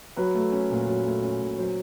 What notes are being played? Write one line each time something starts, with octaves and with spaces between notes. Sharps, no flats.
F#3 B4
A3
C#4
A#2
F#3
A3
C#4
A#2
F#3 C5